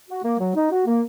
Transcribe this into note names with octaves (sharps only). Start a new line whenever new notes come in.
F#4
A#3
F#3
D#4
F#4
A#3